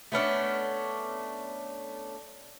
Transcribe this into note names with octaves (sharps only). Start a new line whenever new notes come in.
A3 B3 C#4 D4